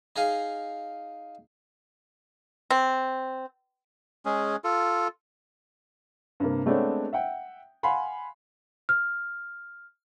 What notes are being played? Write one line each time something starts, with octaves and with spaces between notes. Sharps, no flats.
D#4 G#4 D#5 F5
C4
G#3 C#4 G#4
F4 A4
G2 C3 A#3
G#3 A3 B3 C4 D4 C#5
E5 F#5 G5
F5 F#5 G#5 B5 C6
F6